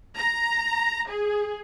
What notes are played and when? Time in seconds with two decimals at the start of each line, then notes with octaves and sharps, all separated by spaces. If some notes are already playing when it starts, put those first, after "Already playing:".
0.17 A#5
1.09 G#4